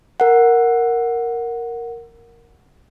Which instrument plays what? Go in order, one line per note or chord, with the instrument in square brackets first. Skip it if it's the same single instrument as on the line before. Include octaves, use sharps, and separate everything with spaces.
[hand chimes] A#4 F#5